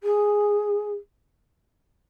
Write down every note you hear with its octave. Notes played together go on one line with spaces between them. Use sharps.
G#4